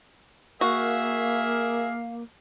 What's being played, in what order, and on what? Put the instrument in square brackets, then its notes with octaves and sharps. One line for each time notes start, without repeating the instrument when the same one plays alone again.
[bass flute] A#3 [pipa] F#4 [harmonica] G#4 E5 E6 [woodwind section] A#4 F5